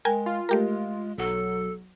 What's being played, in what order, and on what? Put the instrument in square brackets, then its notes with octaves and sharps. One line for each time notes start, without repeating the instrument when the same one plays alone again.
[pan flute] G#3 [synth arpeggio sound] A#4 G5 G#5
[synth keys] F4
[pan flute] G#3 [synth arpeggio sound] A3 G4 A#4
[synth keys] B1 F#3 [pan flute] A4